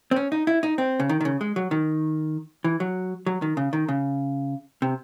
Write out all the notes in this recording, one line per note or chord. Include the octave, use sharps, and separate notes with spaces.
C4
C#4
D#4
E4
D#4
C4
C#3
D#3
D#3
C#3
G#3
F#3
D#3
E3
F#3
F#3
D#3
C#3
D#3
C#3
C3